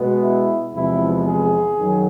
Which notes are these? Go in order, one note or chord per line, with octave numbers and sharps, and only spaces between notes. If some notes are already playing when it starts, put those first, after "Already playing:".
Already playing: B2 G#3 B3
E4
E2 C3 F3 G#3 B3 E4
G#4
F#2 D#3 F#3